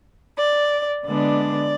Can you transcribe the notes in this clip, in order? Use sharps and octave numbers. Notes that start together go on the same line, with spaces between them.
D5
D3 G#3 B3 D4 D5